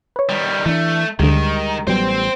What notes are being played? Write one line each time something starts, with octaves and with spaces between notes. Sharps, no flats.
B4 C#5
D#3 G3
E3 A3 D4 B6
D2 D3 D#3 G3 G#3
A1 F#3 G3 B3 C5 G5